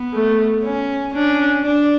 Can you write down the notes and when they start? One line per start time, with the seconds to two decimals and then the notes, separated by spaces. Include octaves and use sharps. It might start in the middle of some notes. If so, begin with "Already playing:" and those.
Already playing: B3
0.13 A3
0.64 C#4
1.15 C#4 D4
1.65 D4